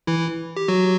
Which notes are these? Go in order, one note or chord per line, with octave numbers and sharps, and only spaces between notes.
E3 E4
G4
F#3 F#4